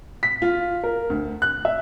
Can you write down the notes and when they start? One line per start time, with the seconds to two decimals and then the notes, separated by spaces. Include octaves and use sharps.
0.23 B6
0.42 F4
0.84 A#4
1.10 D2
1.42 F#6
1.65 E5